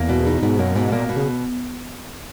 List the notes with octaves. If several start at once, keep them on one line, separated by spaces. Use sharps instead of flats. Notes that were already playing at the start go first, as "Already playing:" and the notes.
Already playing: E2 A#3
B2
D#4
G#2 B2
F#2 A#3
G#2 B2
A#2 A#3
B2
C#3